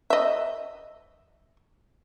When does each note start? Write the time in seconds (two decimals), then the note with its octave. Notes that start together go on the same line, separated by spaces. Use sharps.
0.10 D#5 E5